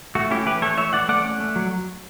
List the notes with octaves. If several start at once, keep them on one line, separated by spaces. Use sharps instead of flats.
A3 F#4
C#4 E4 G4
E3 G4 B4
A3 A4 C#5
E3 C#5 E5
E3 D5 F#5
A3 D5 F#5
C#4
A3
F#3